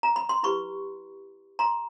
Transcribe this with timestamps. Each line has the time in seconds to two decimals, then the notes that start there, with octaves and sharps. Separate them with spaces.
0.03 A#5
0.16 B5
0.29 C6
0.43 E4 G4 B4 B5 C#6
1.59 A#5 C6